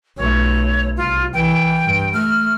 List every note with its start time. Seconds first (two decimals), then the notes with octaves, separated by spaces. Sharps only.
0.17 B1 A3 C#5
0.97 C2 F4
1.34 E3 G5
1.85 G2
2.14 A3 F6